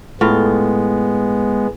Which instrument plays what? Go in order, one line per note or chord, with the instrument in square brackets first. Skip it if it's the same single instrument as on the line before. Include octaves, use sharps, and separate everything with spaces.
[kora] A2 F4 [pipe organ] G#3 B3